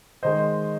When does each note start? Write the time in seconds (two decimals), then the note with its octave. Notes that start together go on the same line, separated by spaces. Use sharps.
0.23 D#3 G#3 C5 D#5